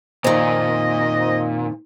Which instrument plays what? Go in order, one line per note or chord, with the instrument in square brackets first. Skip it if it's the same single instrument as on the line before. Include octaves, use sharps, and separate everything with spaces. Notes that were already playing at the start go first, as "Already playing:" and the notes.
[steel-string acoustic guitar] F2 D#3 [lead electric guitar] A#2 [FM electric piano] C5 [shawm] D#5